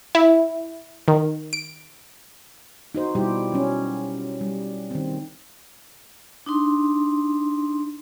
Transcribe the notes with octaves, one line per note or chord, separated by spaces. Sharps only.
E4
D#3
D7
D#4 F#4 C5
B2 G3 E4 G4
F#3 C#4
G3
D#3 C4
D4 D#4 C6